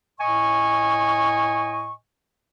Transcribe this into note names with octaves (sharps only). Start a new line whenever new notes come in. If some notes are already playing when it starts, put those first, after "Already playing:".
A2 D#5 G#5 C#6